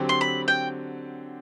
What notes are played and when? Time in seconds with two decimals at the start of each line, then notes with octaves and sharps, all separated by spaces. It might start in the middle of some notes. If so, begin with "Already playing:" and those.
Already playing: D3 F#3 C4 G4
0.09 C6
0.21 B5
0.48 G5